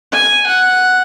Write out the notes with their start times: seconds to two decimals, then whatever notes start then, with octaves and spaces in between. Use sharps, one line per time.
0.12 G#5
0.47 F#5